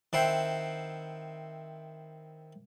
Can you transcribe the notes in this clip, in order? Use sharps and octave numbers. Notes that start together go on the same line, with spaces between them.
D#3 C4 E4 F#5 G5 C6